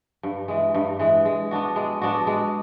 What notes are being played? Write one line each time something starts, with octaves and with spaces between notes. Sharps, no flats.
G2
E3 G#3
G2
E3 G#3
G#3
B3 D4 F#4
G#3
B3 D4 F#4
G#3